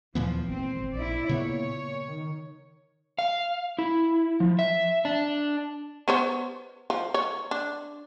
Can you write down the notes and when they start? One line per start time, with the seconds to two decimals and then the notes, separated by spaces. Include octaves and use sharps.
0.15 D#2 A#2 E3 F3 B3
0.49 G#1 C4
0.93 A#1 E4 D5
1.29 A#2 C#3 B3 C#5
1.76 A#2
2.08 D#3
3.19 F5
3.79 E4
4.40 F3
4.59 E5
5.05 D4
6.08 B3 C5 C#5
6.90 F3
7.14 C#5
7.51 D4